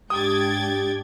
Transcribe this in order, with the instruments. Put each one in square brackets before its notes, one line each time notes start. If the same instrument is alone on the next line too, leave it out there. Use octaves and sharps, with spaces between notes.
[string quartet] G#2 D4 [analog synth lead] G4 [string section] G5 G#6 A6 [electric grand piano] D#6